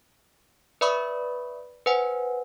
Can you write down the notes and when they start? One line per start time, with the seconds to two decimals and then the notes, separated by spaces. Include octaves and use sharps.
0.81 B4 D5 E5 B5 C#6 D#6
1.86 B4 C5 F#5 G#5